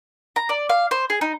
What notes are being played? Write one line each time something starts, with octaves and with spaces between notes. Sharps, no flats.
A#5
D5
F5
C5
G#4
D#4